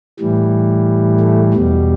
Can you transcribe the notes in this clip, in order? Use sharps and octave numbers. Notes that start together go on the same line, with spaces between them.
A2 E3 G3
A3
E2 B2 G3